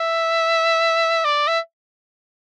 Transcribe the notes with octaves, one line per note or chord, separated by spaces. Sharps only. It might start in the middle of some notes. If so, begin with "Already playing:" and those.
Already playing: E5
D5
E5